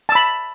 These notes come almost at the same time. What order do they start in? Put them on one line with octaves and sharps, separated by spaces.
A5 E6 B5